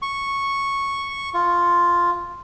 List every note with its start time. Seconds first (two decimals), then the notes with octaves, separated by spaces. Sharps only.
0.02 C#6
1.34 F4